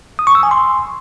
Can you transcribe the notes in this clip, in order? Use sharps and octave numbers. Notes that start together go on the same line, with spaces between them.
D#6
C#6
E6
G#5
C6